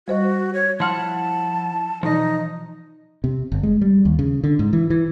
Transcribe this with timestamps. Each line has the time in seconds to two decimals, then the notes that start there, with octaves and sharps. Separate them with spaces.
0.08 G3 F#4 C5 D#5
0.54 C#5
0.80 F3 E4 F#5 A5 C6 F6
2.03 B2 E3 F3 D#4 D#5
3.24 C3
3.52 G1
3.63 G#3
3.81 G3
4.05 D#2
4.19 C#3
4.44 D3
4.59 G#2
4.73 E3
4.90 E3